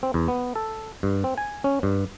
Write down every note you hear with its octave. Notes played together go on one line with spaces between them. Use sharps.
C4
E2
B3
A4
G2
C4
G#5
C#4
G2